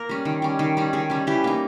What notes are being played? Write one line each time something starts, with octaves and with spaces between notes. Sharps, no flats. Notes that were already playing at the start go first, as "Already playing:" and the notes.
Already playing: A#3 A#4
G3 C#4
D#3
G3 C#4
D#3
G3 C#4
D#3 G#4
G3 C#4
E3 G4
A#3 D#4